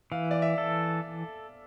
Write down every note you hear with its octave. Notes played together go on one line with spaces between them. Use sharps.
E3 F5
D5
E5
A4